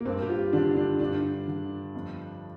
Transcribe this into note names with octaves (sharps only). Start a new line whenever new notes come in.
A#3
G2 C4
G4
F4
D3 D4
D4
G2 D4
D3
F2